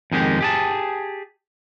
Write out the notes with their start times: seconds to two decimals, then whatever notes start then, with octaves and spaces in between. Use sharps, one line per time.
0.12 F2 D#3 G#3 G4
0.41 G4 G#4 A5